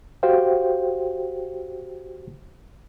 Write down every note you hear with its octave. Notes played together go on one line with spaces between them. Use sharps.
F#4 G4 C5 F5 G5